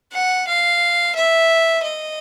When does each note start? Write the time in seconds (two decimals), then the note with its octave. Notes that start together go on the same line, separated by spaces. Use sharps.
0.13 F#5
0.47 F5
1.15 E5
1.83 D#5